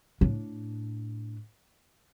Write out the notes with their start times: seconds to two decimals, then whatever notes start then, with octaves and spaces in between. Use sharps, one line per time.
0.21 A2 D4